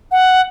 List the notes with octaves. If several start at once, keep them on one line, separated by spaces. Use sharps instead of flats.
F#5